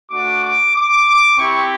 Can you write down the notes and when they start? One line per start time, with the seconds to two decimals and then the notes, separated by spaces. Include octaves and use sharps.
0.11 A3 D4 F#4 D6
0.43 D6
0.74 D6
1.38 C4 E4 G4 C#6